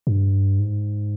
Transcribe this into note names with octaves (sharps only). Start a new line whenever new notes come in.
G2
G#2